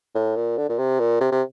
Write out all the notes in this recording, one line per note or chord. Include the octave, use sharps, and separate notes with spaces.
A2
A#2
D3
A#2
C3
A#2
C3
C3